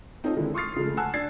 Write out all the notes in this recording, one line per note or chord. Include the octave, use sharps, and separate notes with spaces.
C4 D#4 F4 A4 C#5 D#5
D3 D#3 G#3 E4
C6 C#6 D#6 F6 A6 C7
C#3 F3 G#3 A3
F#5 G#5 A5 E6 F#6
D4 G#6 A6 C7